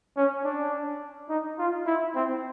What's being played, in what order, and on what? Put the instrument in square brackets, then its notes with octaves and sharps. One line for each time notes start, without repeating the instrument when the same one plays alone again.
[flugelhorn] C#4
D4
D#4
F4
E4
C4